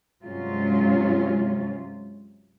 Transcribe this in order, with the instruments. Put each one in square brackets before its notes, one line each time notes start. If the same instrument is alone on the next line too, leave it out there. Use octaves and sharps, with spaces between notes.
[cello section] G2 C3 F#3 G#3 C#4 F4